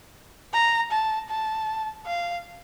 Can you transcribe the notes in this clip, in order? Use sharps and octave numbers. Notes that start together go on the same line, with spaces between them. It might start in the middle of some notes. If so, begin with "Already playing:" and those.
A#5
A5
A5
F5